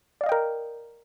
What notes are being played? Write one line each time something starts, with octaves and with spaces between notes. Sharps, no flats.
A#4 D5 D#5 F5 G5